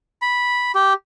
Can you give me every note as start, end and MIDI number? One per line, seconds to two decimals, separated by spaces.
0.22 0.72 83
0.75 0.93 67